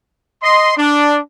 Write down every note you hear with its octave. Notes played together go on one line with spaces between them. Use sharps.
D#5 C6
D4